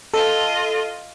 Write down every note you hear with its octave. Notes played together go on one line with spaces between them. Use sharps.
F4 A4 D#5